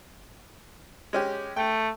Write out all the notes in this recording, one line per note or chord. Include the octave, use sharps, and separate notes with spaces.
G#3 C#4 G4
A3 G5